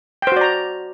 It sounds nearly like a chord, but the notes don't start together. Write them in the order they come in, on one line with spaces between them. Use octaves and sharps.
G5 C5 F#4 D5 A#5